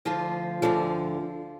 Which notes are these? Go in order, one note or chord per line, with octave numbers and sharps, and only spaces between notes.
D2 D3 F3 F4
D2 D3 F3